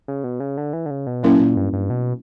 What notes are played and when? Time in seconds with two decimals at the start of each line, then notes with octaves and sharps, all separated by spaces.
0.08 C#3
0.24 B2
0.40 C#3
0.58 D3
0.73 E3
0.86 D3
0.91 C#3
1.07 B2
1.23 A#2 F#3 A#3 C#4 E4 A#4
1.40 A#2
1.57 G2
1.73 G2
1.90 B2